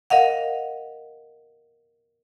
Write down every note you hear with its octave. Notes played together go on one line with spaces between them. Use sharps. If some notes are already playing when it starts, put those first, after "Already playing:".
A#4 D#5 F5 F#5